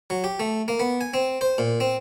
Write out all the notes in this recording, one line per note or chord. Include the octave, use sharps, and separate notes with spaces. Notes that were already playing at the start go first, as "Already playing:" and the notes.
F#3
G4
A3
A#3
B3
G#5
C4
C5
A#2
C4